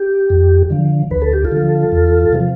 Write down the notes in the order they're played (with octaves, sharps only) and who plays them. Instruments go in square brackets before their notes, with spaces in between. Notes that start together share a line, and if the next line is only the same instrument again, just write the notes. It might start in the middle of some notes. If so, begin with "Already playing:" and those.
Already playing: [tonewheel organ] G4
F2
D3 F3
D2 B4
A4
G4
F4 A4
D3 F3
E2
C3 F3